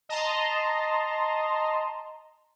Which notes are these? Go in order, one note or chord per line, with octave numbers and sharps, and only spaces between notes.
D#5 A5 A#5 C6